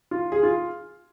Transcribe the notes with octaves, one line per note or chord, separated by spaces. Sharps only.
F4
G#4
F4